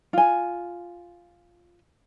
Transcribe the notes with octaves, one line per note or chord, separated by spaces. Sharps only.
F4 G#5